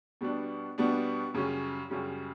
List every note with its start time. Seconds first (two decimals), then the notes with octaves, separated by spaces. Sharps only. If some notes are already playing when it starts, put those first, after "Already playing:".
0.21 B2 G3 B3 D4
0.78 B2 G3 B3 D4
1.34 F#2 C#3 G3 C#4
1.90 F#2 C#3 G3 C#4